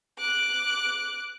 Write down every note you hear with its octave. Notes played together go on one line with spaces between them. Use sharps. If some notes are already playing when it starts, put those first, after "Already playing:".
D6 F#6